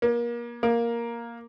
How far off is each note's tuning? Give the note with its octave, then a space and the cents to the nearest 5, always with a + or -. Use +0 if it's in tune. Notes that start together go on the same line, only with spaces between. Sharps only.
A#3 +30
A#3 +5